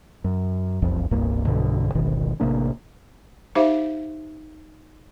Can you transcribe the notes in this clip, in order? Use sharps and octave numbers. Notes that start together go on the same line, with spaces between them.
F#2
E1 B1 F2 F3
E1 C2 G2 A#3
B1 G2 B2 D3
D1 G#1 B2 D#3
A1 C3 A#3 D4
D#4 G4 C5 E5 F5 D6